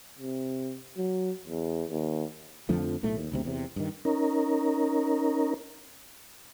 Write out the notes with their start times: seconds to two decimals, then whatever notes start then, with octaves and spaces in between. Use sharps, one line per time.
0.19 C3
0.98 F#3
1.46 E2
1.90 D#2
2.69 F2 D3 F3 A3
3.03 B1 A2 A3
3.17 D#2
3.32 F#1 D2 C3
3.45 E2 C3
3.76 G2 D#3
4.05 C#4 D#4 A#4